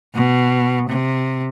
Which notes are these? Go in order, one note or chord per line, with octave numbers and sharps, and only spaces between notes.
B2
C3